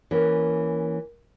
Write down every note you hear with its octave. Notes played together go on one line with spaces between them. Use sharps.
E3 A#3 C#4